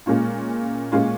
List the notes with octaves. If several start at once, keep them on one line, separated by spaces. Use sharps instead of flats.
A#2 G#3 C#4 F4
A#2 G#3 C#4 F4